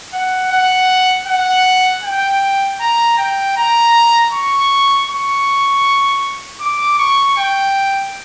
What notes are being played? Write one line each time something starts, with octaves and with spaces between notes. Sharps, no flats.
F#5
F#5
F#5
G5
A#5
G5
A#5
C#6
C#6
D6
C#6
G5